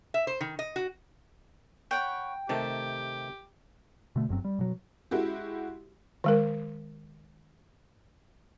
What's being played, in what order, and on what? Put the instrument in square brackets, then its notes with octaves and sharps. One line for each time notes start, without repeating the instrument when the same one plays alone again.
[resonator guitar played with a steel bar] E5
C5
D#3
D#5
F#4
[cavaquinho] C#5 F#5 B5 [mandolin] G5
[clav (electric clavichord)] C3 D#3 A3 [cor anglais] G4 [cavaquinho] A5
[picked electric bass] B2 D3 A3
F#1 G2 F#3 C4
G3
B2 F#3
[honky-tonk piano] G#3 E4 F#4 G4
[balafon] D#3 G#3 A#4